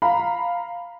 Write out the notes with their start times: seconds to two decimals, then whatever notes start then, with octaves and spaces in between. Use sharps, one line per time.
0.02 F5 A#5 B5